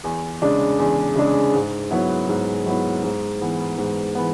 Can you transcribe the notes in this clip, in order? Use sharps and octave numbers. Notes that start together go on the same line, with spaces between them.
E2
C#3 G#3 D4
E2
C#3 G#3 D4
G#2
F#3 B3 E4
G#2
F#3 B3 E4
G#2
E3 B3
G#2
E3 B3